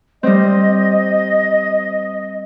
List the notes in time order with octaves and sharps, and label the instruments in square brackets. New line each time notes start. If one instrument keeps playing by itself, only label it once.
[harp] G3 C4 [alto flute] D#5